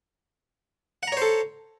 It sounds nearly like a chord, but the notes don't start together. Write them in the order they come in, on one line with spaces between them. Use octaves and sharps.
F#5 A#5 C#5 C5 A4